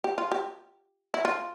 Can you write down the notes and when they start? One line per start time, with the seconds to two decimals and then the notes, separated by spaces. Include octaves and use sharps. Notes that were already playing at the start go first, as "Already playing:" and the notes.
0.04 G4
0.18 F4
0.32 G4
1.14 E4
1.25 F4